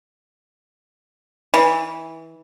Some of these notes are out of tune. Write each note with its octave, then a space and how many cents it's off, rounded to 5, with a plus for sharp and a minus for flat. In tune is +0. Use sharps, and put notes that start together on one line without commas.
E3 -20